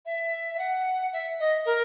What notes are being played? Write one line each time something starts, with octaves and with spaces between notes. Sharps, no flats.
E5
E5
F#5
E5
D#5
A#4